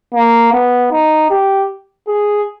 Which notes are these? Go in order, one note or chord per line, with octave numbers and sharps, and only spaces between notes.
A#3
B3
D#4
G4
G#4